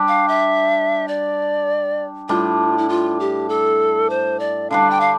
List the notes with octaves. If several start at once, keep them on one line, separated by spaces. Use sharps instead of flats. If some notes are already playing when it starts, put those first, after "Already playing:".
Already playing: G3 D4 G4
F5
E5
D5
A2 G3 D4 F4
E4
F4
G4
A4
C5
D5
D3 G3 D4 F5
G5
F5